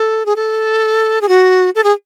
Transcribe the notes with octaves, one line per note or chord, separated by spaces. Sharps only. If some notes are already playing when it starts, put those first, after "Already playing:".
Already playing: A4
G#4
A4
G#4
F#4
A4
G#4